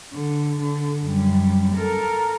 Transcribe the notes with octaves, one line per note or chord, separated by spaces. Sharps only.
D3
D3
F#2 G3
A4 A#4